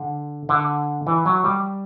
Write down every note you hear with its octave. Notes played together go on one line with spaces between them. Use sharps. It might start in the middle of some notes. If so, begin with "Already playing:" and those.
Already playing: D3
D3
E3
F#3
G3